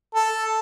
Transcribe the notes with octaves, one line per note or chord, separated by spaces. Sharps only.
A4